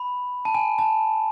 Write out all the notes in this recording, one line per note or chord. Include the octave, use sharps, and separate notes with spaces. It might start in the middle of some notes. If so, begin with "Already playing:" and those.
Already playing: B5
A5
G#5
A5